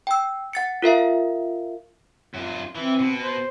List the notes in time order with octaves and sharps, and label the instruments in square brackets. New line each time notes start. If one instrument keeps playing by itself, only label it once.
[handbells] G5 E6
F#5 A6 C#7
F4 A#4 E5 F5
[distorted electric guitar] F#2 F4
[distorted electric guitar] E3 [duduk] C4
[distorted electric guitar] B2
[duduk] C5